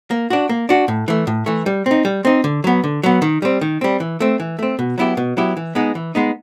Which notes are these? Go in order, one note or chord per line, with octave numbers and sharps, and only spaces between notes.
A#3
D4 F#4
A#3
D4 F#4
A2
E3 A3
A2
E3 A3
G3
C4 D#4
G3
C4 D#4
D3
F#3 B3
D3
F#3 B3
D#3
G3 C4
D#3
G3 C4
E3
A3 C4
E3
A3 C4
B2
F#3 B3 E4 G4
B2
F#3 B3 E4 G4
E3
G#3 B3 D#4
E3
G#3 B3 D#4